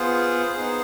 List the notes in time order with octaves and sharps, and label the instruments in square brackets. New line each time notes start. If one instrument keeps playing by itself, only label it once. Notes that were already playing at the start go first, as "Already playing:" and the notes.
Already playing: [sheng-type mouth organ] B3 F4 G#4 C5
B3 D#4 G#4